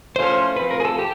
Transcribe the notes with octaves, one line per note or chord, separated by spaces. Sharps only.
A2 F3 A3 C#4 F4 C5
F3 A3 C4 B4
A#4
G#4
A4
G4